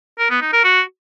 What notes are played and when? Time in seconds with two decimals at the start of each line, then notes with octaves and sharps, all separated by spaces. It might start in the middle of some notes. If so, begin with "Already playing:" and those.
0.19 A#4
0.30 B3
0.42 D#4
0.53 A#4
0.64 F#4